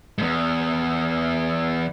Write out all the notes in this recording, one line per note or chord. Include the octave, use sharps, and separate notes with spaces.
E2 G#2